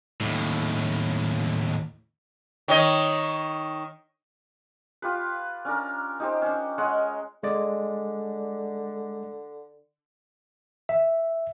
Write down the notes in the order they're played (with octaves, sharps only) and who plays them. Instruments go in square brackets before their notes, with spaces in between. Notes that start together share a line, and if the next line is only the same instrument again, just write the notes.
[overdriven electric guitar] D#2 A2
[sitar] D#3 C#5 D#5
[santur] F4 G4 B4
C#4 D4 A#4
D#4 G4 C5
C#4 D4
G#3 C#5 D#5 F#5
[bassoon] D3 [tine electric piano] G#3 D5
[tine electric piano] E5